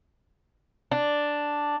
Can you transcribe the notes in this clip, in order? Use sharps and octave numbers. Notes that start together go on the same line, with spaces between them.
D4